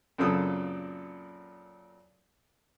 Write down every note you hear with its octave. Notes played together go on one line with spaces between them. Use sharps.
F#2 A#2 C#3 C4 A4 D#6